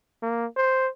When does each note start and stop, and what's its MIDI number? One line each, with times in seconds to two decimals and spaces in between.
0.23 0.46 58
0.56 0.88 72